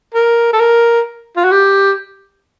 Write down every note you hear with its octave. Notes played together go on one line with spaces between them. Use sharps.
A#4
A4
A#4
F4
F#4
G4